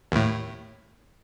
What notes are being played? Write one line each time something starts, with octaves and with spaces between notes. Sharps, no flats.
D#2 A2